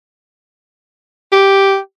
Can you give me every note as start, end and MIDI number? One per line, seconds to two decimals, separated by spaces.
1.32 1.78 67